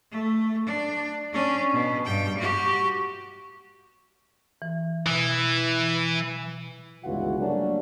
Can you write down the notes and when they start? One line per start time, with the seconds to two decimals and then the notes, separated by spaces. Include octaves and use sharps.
0.11 A3
0.66 D4
1.33 C#4 D4
1.73 B2
2.05 G2 G5
2.38 F#4 G4
4.62 E3
5.06 B2 E3
7.04 G1 C#2 E3 F4 F#4 F#5
7.40 F#3 G3 A3 A#3 C#4 D4